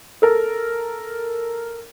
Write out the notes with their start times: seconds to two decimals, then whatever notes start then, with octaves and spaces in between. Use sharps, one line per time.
0.22 A4 A#4